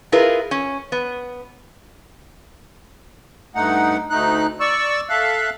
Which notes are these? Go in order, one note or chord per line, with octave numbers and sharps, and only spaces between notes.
E4 F4 G#4 A#4 B4
C#4
B3
G2 A3 D#4 F#5
D2 A3 D#4 F#6
D5 C#6 E6
A4 E5 F5 F#6